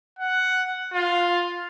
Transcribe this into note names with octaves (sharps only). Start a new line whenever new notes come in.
F#5
F4